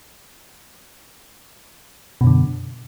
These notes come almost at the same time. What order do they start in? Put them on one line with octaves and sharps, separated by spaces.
B2 F#2 D3